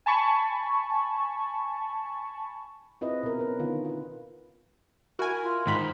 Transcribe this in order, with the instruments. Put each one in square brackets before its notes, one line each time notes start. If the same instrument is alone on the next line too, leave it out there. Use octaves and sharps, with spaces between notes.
[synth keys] G#5 A5 B5 C#6
[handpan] C4 E4 F4 G#4 B4 D#5
B2 A#4
C#4 B4
D3 D#3 B3 F4
F4 B4
[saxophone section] E4 A#4 [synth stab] F#4 G#5
[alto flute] F4
[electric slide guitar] G#2 [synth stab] D#3 B5